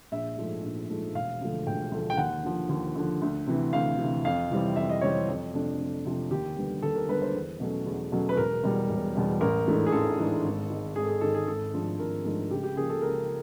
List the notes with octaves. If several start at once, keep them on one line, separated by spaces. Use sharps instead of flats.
A#1 E5
G#2 F3 A3
A#1
G#2 F3 A3
E1 F5
D2 D3 F3 A3
E1 G5
D2 D3 F3 A3
G5
D#2 F#5
D3 F3
D#2
D3 F3
D2
C3 E3
D2 F5
C3 E3
F2 F5
C3 E3 G3 C4
F2 E5
D#5
C3 E3 G3 C4 C#5
F2
C3 F3 A3 D4
F2
C3 F3 A3 D4
D#2 G4
D3 G3 B3
D#2 A4
A#4
D3 G3 B3 B4
C5
E2
B2 F#3 A3 C#4
E2
B2 F#3 A3 C#4
B4
E1 A#4
E2 B2 G3
E1
E2 B2 G3
A1 A#4
G#2 E3 A3 D4
G#4
A1 A4
G#2 E3 A3 D4
G#1
G#2 D#3
G#1 G#4
A4
G#4
G#2 D#3 A4
G#4
G#1 A4
G#2 F3 A3 D4
G#1 A#4
G#2 F3 A3 D4 A4
C#2 G4
G4
C#3 F3 A#3 G#4
A4
C#2 A#4